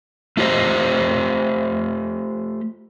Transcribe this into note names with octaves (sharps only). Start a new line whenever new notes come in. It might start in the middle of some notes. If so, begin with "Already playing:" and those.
A3 F4 G4 C5 D#5